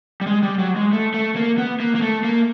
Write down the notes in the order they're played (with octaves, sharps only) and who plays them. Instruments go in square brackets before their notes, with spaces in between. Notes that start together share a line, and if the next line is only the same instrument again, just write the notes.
[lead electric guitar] G3
G#3
G3
F#3
G#3
A3
A3
A#3
B3
A#3
A#3
A3
A#3